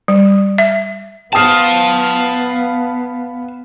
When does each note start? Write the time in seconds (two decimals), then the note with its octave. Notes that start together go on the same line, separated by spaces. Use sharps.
0.08 G3
0.58 E5
1.33 B3 F5 G5 A5 D#6 F6